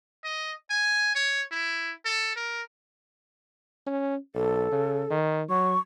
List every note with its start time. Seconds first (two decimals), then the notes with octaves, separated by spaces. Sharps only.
0.24 D#5
0.70 G#5
1.15 C#5
1.52 E4
2.05 A4
2.36 A#4
3.86 C#4
4.35 B1 A4
4.72 C#3
5.10 D#3
5.49 F#3 C#6